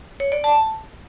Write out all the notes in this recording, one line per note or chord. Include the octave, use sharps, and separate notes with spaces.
C#5
D5
A5